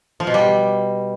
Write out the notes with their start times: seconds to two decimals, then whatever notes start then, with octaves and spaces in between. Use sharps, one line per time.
0.20 F3
0.27 B2
0.34 G3